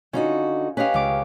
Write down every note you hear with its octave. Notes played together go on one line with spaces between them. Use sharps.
D3 C#4 D#4 F4 F#4
C#4 G4 B4 D#5 F5
C#2 D6